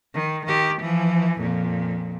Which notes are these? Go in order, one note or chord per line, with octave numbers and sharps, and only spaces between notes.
D#3
D#3 G4
E3 F3
F2 A#2